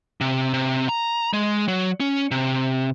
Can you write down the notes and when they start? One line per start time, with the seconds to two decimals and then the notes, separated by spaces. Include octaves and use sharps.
0.21 C3
0.54 C3
0.89 A#5
1.33 G#3
1.68 F#3
2.00 C#4
2.31 C3